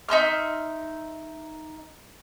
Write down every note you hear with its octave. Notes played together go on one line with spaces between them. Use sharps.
D#4 E5 C6 F6